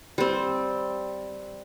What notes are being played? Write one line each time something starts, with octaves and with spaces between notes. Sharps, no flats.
G3 C4